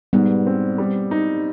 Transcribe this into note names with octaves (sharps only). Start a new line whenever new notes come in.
G#2 G3 B3
C4
G3
D#4